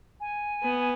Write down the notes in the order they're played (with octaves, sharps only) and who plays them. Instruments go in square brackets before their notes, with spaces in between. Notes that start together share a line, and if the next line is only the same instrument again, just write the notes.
[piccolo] G#5
[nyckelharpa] B3